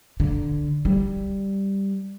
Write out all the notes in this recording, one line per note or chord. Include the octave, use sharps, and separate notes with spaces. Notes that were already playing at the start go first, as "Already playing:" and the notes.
D3
G3